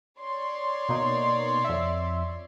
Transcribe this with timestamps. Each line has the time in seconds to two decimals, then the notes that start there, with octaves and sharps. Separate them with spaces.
0.19 C#5 D5 C6
0.89 B2 A#3 D#4
1.65 F2 E5